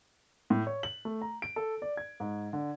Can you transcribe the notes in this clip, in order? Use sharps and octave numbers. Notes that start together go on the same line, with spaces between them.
A2
C#5
F#7
A3
A#5
D7
A4
D5
G#6
G#2
D3